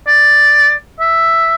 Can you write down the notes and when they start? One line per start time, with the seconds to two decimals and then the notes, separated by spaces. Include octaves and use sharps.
0.07 D5
1.00 E5